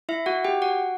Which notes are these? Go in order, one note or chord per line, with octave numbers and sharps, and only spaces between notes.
E4 E5
F#4 F#5
G4 G5
F#4 F#5